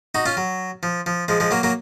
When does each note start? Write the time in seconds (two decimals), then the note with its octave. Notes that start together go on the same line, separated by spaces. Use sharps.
0.15 D#4 F#4
0.26 C#4 F4
0.37 F#3
0.83 F3
1.06 F3
1.28 F3 G#3
1.40 F3 G#3
1.51 F#3 A#3
1.63 F#3 A#3